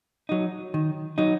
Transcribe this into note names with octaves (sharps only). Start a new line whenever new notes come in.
F#3 D#4
D#3
F#3 D#4